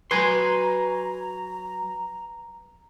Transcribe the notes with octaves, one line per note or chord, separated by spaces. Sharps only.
F#3 B4 G#5 A#5 C6